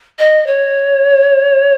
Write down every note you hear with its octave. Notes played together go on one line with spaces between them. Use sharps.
D#5
C#5